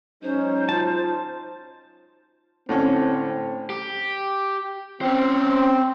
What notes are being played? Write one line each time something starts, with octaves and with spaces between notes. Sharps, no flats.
F#3 G#3 C#4 D#4 C5
F4 A5
A2 D3 C4 C#4
G4
C4 C#4 C5